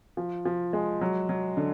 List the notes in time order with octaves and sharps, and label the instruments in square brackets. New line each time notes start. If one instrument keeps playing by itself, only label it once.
[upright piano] F3
F3
G#3
F#3
F#3
D3